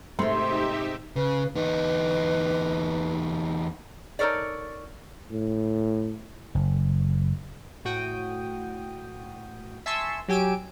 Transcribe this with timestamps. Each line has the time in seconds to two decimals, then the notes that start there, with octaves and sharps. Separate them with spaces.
0.19 G#2 C3 A3 D#4 G4 E5 C6
1.16 C#3 B4
1.55 E2 D#4 B4
4.19 D#4 A4 A#4 C#5 D5
5.31 A2
6.55 F#1
7.85 A2 F#4 G5 D#6
9.86 E5 G#5 A5 C6 C#6 E6
10.28 F#3 G4 G#5 E6 D7